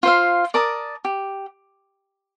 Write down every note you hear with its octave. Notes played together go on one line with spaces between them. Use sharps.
F4 C5 F5
A#4 D5 A5 D#6
G4